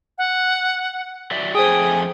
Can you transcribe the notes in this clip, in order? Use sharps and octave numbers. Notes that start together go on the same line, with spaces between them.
F#5
F#3 D5 E5
F2 A3 G#4 C5 G5 G#5 D#6